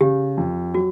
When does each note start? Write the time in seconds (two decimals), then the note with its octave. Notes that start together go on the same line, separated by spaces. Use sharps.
0.01 C#3 G4
0.37 F2
0.74 F#3 F#4